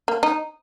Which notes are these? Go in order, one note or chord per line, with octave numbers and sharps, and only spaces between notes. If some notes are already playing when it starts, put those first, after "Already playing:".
A#3
D#4